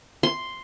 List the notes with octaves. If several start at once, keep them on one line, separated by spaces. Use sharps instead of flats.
C6